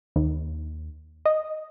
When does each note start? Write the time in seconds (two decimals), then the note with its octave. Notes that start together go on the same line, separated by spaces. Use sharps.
0.16 D#2
1.25 D#5